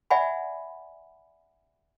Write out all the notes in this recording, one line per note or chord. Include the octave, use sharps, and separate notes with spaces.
D5 E5 F#5 G#5 B5